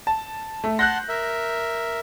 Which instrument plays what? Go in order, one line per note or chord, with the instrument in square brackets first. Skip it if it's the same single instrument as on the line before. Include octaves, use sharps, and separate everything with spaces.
[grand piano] A5
A3
[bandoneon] F#5 A5 C6 [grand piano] F#6 G6 A#6
[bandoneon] A#4 E5